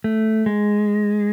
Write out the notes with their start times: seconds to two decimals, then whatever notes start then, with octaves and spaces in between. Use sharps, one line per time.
0.04 A3
0.46 G#3